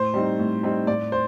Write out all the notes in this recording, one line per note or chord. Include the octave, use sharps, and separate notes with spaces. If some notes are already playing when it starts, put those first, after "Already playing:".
Already playing: A2 C5
G3 C4 D#4
A2
G3 C4 D#4
A2 D5
C5